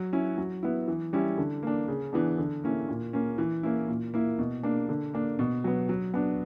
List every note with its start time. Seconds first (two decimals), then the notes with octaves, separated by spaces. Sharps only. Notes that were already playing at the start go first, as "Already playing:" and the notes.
Already playing: F#3
0.13 C#4 E4
0.38 F#3
0.63 B3 E4
0.88 E3
1.13 G3 C#4 E4
1.38 D3
1.63 A#3 D4
1.88 C#3
2.13 E3 B3 D4
2.38 D3
2.64 A#3 C#4 E4
2.88 A#2
3.13 A#3 C#4
3.38 E3
3.63 A#3 C#4 E4
3.88 A#2
4.14 A#3 E4
4.39 B2
4.63 A#3 D4
4.89 D3
5.14 A#3 D4
5.39 B2
5.64 F#3 B3
5.89 F#3
6.14 B3 D4